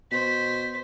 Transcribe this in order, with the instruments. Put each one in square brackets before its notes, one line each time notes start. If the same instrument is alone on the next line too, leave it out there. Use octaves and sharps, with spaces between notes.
[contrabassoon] B2 [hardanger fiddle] C5 [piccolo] B6